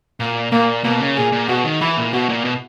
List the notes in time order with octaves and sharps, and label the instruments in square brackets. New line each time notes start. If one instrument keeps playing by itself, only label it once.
[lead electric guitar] A#2 [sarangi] A#3
[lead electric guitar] A#2 [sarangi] A#3
[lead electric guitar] B2 [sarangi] A#3
[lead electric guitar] C#3
[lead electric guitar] A#2 [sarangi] G#4
[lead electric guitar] A#2
[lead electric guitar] B2 [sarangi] F#4
[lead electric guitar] D#3
[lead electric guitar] E3 [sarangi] E4
[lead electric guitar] A#2
[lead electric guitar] B2 [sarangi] F#4
[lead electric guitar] A#2
B2